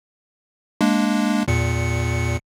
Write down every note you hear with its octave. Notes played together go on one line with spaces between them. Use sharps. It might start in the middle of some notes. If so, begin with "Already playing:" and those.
G#3 A#3 D4
E2 A#2 C#7